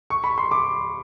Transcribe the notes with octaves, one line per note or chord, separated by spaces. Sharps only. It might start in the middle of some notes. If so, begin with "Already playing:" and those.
C#6
B5
C6
D6